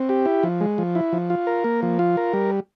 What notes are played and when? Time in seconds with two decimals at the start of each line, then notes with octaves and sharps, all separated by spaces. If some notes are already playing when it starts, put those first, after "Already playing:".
Already playing: C4
0.09 G4
0.26 E4
0.43 F3
0.60 G#3
0.78 F3
0.95 E4
1.13 F3
1.30 F4
1.47 A#4
1.64 A#3
1.83 F3
1.99 F4
2.17 A#4
2.33 G3